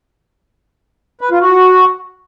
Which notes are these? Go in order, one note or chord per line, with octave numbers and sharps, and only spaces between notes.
B4
F4
F#4